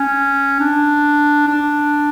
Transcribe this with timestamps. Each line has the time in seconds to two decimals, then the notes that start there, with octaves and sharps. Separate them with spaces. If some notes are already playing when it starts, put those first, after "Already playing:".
Already playing: C#4
0.60 D4
1.48 D4